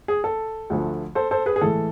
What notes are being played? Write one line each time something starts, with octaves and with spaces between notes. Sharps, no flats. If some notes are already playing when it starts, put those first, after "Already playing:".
G#4
A4
D2 D3 F3 A3
A4 C5
A4 C5
G#4 B4
G#4
A2 E3 G#3 A4